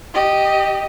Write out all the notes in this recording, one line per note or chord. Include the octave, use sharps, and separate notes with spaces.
G4 D#5